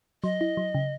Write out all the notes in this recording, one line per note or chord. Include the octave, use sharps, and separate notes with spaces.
F#3 D#5
E4
F#3
C#3